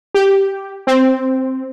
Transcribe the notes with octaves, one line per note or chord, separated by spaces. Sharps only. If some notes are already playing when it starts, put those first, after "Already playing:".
G4
C4